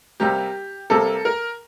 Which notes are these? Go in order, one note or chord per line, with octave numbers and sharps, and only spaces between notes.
C3 G3 A#3 G4
C3 G3 A#3 A4
A#4